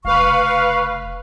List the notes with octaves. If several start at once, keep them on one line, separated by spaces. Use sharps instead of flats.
F1 C#3 B4 F5 C#6